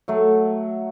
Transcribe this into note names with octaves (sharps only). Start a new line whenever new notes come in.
F#3 A3